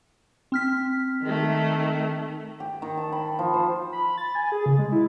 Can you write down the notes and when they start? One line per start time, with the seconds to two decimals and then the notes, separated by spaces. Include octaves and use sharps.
0.52 C4 F6 B6
1.23 D#3 A3
2.60 G4
2.82 D#3
2.97 A5
3.12 B5
3.39 F3
3.54 C5
3.93 B5
4.18 A6
4.35 G#5
4.52 G#4
4.66 C#3
4.78 G#3
4.92 E4